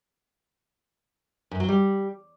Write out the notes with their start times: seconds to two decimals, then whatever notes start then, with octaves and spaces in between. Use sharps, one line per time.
1.51 F#2
1.60 F#3
1.68 G3